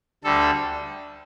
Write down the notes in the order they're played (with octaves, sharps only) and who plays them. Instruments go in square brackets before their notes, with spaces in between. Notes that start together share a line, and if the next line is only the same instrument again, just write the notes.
[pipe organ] D2 D3 G3 A4